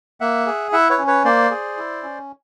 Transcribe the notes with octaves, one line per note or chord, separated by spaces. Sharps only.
A#3 E5 F#5
G#4
E4 E5 F#5
B4 C#5
C#4
B4 C#5
A#3 C5 D5
G#4
E4
C#4